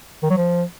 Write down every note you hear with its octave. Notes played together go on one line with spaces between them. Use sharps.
D#3
F#3
F3